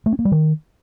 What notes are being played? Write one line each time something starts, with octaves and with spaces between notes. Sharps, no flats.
A3
C#4
A#3
G3
D#3